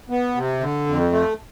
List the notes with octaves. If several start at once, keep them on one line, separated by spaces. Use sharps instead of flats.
B3
C3
D3
F2
A3